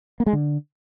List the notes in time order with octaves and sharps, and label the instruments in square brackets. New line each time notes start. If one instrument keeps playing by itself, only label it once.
[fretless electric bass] A#3
G#3
D3